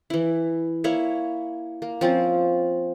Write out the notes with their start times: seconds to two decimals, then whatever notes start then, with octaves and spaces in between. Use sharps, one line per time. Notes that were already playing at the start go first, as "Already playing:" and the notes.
0.10 E3 E4
0.84 A#3 E4 C#5 E5
1.82 A#3
2.01 F3 C4 C#4 F4